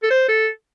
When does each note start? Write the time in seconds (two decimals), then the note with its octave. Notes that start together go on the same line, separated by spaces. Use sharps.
0.03 A4
0.10 C5
0.28 A4